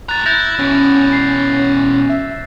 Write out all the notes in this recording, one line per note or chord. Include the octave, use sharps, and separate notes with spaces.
A2 A#5 F#6 A6
E4 G6 A6 A#6
B2 E3 C#4
C7
E5